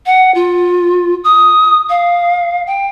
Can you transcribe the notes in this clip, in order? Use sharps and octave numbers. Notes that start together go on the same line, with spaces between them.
F#5
F4
D#6
F5
G5